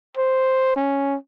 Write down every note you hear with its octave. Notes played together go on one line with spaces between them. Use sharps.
C5
C#4